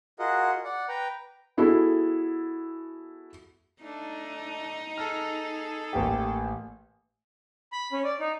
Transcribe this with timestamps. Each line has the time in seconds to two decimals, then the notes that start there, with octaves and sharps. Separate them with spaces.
0.19 F4 F#4 G#4 A#4 D#5 F#5
0.64 D5 F#5
0.89 B4 G5 A#5
1.57 B3 E4 F#4 G#4 A4
3.82 A3 D4 D#4
4.98 G#4 A4 F6
5.93 A1 A#3 G4
7.72 B5
7.92 C#4
8.04 D5
8.20 D#4